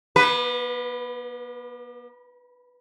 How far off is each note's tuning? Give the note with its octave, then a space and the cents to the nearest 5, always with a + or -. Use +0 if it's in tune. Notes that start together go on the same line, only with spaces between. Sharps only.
B3 -45 B4 +0